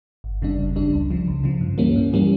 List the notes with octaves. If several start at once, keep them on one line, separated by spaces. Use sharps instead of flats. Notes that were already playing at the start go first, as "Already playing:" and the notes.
G1
F2 C#3 G3 D4
G1
F2 C#3 G3 D4
C#2
C#3 F3
C#2
C#3 F3
G2
E3 G3 A#3 C#4
G2
E3 G3 A#3 C#4